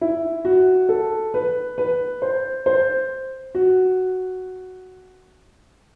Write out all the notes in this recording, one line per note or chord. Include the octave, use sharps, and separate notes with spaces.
E4
F#4
A4
B4
B4
C5
C5
F#4